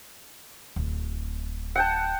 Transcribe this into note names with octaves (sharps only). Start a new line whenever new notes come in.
D1
F#5 G5 A5